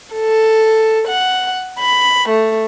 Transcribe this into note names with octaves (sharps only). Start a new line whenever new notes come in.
A4
F#5
B5
A3